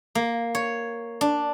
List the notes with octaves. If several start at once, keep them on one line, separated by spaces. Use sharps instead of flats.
A#3
C#5
D4